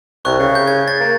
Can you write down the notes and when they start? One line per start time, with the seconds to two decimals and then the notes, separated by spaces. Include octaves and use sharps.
0.25 C2 C#6 F#6
0.39 C#3
0.55 G6
0.67 G#6
0.88 A6
1.00 A#3